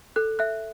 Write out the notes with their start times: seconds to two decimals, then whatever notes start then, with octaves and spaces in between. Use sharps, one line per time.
0.16 A4 F#6
0.39 E5 F#6